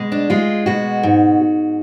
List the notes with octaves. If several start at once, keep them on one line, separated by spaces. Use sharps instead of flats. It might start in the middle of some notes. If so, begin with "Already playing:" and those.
Already playing: B2 G#3
D4
G#3 F4
B2 F#4
G#2